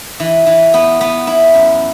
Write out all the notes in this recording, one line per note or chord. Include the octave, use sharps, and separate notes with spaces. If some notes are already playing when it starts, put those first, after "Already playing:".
E3
E3
B3
B3
E4
F#2